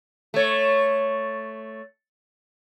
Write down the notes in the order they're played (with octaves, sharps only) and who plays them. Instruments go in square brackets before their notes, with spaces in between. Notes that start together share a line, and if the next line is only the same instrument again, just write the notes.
[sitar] A3 C#5